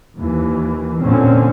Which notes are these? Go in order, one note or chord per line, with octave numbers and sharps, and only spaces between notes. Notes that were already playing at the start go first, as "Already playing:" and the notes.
D#2 E3
F1 A#2 D3 C4 C#4